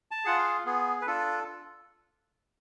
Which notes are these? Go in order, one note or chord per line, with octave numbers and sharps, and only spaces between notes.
A5
F4 G#4 F#5
F5
B3 G#4
B4
D4 F4 A4